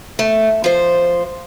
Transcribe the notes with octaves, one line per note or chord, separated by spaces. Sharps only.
A3
F3 C5